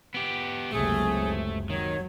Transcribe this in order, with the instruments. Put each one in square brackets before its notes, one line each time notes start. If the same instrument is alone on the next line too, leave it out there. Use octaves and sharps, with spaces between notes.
[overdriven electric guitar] B3 G4
[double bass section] F#1 C#2 C3 [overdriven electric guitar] A3 [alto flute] G#4
[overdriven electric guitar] D#3 [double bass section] F#3 [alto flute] C#5